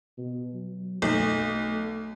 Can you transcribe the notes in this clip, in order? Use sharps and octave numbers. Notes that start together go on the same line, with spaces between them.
B2
F#3
B1 A3
A3